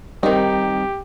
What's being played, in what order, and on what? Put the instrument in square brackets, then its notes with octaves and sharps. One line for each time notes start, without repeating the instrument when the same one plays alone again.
[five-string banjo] D#3 D#4 [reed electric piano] G3 C4 [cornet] G4